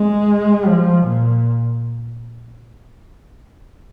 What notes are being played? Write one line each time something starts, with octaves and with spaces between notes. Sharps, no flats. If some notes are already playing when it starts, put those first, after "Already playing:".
Already playing: G#3
F3
A#2